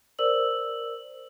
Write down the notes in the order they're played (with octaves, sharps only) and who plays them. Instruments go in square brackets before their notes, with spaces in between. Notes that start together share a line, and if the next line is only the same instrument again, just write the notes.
[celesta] A#4 C5 D5 E6 F#7